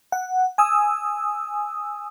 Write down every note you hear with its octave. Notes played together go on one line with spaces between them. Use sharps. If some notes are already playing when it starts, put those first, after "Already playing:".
F#5
G#5 D#6 E6